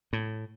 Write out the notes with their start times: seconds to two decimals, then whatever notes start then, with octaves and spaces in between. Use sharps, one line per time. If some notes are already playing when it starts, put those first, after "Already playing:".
0.13 A2